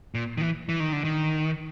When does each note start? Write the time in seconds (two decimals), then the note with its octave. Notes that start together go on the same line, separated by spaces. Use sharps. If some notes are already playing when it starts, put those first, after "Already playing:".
0.14 A#2
0.37 D#3
0.41 E3
0.69 E3
0.80 D#3
0.92 D3
1.05 D#3